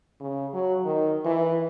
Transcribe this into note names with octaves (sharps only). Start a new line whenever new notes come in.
C#3
F#3
D#3
E3